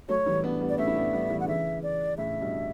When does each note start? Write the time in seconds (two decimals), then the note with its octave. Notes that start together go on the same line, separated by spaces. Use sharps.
0.08 F#3 A3 C#5
0.26 E3 G3
0.44 B3 D4
0.61 G3 B3
0.69 D5
0.78 A3 C#4 E5
0.87 E4
0.96 B3 D4
1.13 G3 B3
1.30 E3 G3
1.40 F#5
1.44 D3
1.48 C#3 E3 E5
1.83 D5
2.17 A2 C#3 E5
2.41 G2 B2